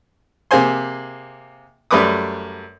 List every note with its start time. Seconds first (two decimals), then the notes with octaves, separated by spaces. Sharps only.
0.51 C3 A#3 G#4 C5 G#5 C6
1.91 F#2 G3 A3 B4 D6 D#6